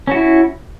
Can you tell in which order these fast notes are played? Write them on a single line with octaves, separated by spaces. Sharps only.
C#4 F#4 E4